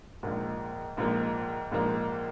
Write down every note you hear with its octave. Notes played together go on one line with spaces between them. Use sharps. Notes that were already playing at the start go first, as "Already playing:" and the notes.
A#1 G#2 F3 A#3
A#1 G#2 F3 A#3
A#1 G#2 F3 A#3